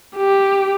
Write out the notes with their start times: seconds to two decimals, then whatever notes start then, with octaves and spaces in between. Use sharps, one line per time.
0.17 G4